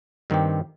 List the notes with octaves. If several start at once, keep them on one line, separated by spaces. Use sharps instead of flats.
G2 D#3 C4 G4